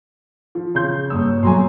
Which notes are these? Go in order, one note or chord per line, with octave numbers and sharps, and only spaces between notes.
F3
C#3 C6 G6
G2 A#3 C#5 D#6 E6
B2 F#3 A3 G#5 A#5 C6